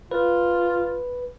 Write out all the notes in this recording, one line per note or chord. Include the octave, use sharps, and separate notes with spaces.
F4 B4